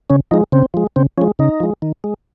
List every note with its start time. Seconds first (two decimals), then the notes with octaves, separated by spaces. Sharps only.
0.10 C#3 C#4
0.31 F3 G#3 D#4
0.52 C#3 C4
0.74 F3 G#3
0.96 C#3 C4
1.18 F3 G#3 C#4
1.39 C#3 D#4
1.60 F3 G#3
1.82 D#3
2.04 G#3